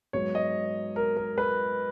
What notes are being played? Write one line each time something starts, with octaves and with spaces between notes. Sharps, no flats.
G#2 F#3 B3 C#5
D#5
A#4
A#4
B4